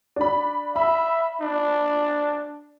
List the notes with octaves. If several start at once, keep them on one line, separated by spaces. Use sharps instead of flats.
D4 B5
E5 B5
D4